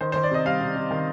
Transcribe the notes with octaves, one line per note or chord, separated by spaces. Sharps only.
D#3 C5
D#3 C5
D5
C3 D#5
G3 F5
C3
C3
D#3